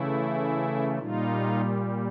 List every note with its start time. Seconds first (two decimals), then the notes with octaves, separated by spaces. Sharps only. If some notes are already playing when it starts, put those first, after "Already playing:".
Already playing: C#3 E3 A3 E4
0.98 A#2 G3 D#4 F4